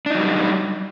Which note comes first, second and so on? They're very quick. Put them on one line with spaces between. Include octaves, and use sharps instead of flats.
D4 D#4 F#3 G3